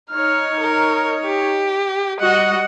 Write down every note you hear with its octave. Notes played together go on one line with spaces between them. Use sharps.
D#4 C#5 F6
A#4
G4
G3 F#4 D#5 F#5